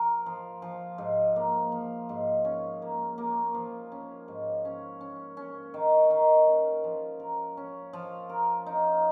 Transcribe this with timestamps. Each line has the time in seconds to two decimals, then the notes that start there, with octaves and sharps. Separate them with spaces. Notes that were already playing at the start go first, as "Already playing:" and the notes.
Already playing: F3 A#4
0.26 F3
0.62 F3
0.98 G#2
1.36 A#3
1.72 F3
2.09 G#2
2.45 C#4
2.82 A#3
3.18 A#3
3.54 F3
3.92 C#4
4.28 G#2
4.65 C#4
5.01 C#4
5.37 C#4
5.74 D#3
6.10 D#3
6.47 C#4
6.84 F3
7.20 A#4
7.57 C#4
7.93 F3
8.29 A#4
8.66 D#4